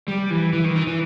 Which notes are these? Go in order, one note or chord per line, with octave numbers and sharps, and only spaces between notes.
G3
E3
E3
D#3
E3
E3